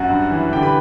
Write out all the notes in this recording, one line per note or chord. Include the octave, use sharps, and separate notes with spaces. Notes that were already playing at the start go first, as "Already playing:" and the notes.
Already playing: F#2 F#4 F#5
G2
E3
D3 G4 G5
B4 B5